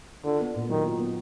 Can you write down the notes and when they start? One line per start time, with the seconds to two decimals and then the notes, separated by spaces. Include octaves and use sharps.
0.24 D3 F4
0.40 B3
0.55 A#2
0.69 D#3 F#3
0.84 F4
0.99 B3